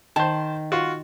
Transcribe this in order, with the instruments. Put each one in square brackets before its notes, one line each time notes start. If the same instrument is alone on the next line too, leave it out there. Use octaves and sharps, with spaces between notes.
[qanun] D#3 [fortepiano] C5 A5
[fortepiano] F4 F#4